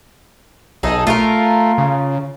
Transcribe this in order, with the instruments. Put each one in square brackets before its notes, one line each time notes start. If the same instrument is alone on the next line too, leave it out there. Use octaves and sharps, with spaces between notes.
[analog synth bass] B1 [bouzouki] D#4 G#4 A4
[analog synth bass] A3 [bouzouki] F4 F#4 A#4
[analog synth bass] C#3